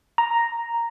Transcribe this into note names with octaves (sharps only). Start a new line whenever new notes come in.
A#5